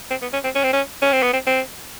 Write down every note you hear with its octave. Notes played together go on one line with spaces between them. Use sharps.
C4
B3
C#4
C4
C#4
C4
C#4
C#4
C4
B3
C4
C4